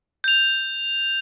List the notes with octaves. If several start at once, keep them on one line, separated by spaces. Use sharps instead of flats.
G6 F7